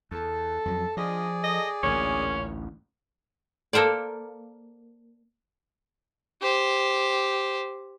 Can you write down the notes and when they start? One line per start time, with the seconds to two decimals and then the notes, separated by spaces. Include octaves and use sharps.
0.11 E2 A4
0.65 F2 F#3
0.97 F3 D4 F4 G#4 D5 D#5
1.42 A4 D#5
1.83 A1 D2 A#2 C#4
3.73 A#3 A4 A#4 C5 D5
6.41 G4 C5